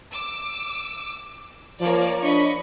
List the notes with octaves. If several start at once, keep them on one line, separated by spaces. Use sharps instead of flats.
D6 E6
F3 A#3 C#5 D5
D4 D#5 B5 C#6